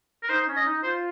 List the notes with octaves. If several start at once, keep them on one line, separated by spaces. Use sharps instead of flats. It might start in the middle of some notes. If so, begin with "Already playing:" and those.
A#4
D#4 C5
C#4
D#5
D#4
F4 C5